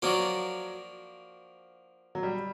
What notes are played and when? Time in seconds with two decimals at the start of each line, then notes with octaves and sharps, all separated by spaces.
0.02 F3 F#3 A#3 D4 F#4
2.15 F#3
2.23 G3